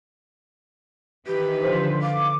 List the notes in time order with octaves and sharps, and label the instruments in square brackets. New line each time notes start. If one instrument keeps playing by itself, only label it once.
[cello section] D#3 E3 B4 [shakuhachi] G4
[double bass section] D3 F3 [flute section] C5
[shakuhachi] F5 [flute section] D6